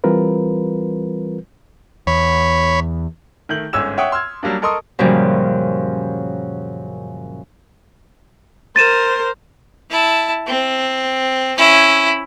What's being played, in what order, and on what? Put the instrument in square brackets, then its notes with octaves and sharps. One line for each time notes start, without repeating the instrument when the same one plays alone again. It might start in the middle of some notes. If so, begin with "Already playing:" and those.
[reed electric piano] E3 G3 C4 F4 A#4 B4
[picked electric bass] E2 [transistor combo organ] C#5 B5
[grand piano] D#3 A3 G6 F#7
G1 G#2 C#4 E6 G#6 E7
C#5 E5 F#5 G5 C#6 D#6
C6 E6 F6 G#6
F#3 G3 A#3 D4
A4 A#4 D#5 C6 C#6 D#6
[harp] F#2 A#2 C#3 F3 G3
[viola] A#4 C5 [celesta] A6 D#7 E7
[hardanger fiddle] E4 A5
C4
C#4 E4